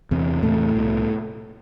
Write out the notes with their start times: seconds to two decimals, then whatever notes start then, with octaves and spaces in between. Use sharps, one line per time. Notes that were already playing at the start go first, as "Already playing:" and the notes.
0.11 E2 C3
0.43 E2 A2 C3 A3
0.76 C2 B2